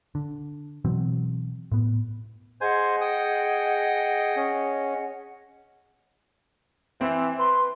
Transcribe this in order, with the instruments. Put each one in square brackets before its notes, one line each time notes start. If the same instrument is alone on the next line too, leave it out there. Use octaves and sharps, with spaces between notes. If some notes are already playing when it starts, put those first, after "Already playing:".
[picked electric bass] D3
B2 E3 F#3 C4
A2 B3
[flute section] G#4 D#5 F#5 [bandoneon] C5 G#5
[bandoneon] G5 D#6
C#4
[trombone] E3 [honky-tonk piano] C4
[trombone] B4 [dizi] C6